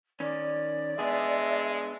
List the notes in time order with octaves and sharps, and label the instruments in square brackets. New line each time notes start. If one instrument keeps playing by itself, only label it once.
[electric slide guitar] D#3 C#4 [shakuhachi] D5
[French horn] G#3 [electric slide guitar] B3 D4 G#4 [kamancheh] E5